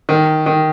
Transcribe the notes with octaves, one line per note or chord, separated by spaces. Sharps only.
D#3
D#3